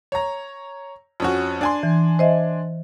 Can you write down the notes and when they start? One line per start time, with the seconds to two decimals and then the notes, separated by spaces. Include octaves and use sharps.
0.12 C#5 A#5
1.20 F2 C#4 F#4
1.61 D4 G#5 C6
1.83 E3
2.19 C5 D#5 E5